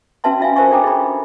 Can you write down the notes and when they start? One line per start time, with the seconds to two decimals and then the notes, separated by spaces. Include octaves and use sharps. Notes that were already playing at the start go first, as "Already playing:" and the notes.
0.24 C#4 F#4 B4 E5 A5 C6
0.40 C#4 F4 E5 F5 G#5
0.56 F4 A#4 C5 E5 G#5 C#6
0.71 D4 A4 G5 A#5 D6
0.84 G#4 B5